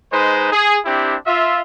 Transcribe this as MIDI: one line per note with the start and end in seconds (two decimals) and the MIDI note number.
0.13 0.52 56
0.13 0.52 63
0.13 0.52 71
0.13 0.52 72
0.53 0.78 68
0.85 1.16 60
0.85 1.16 62
0.85 1.16 64
0.85 1.16 67
1.27 1.61 65
1.27 1.61 76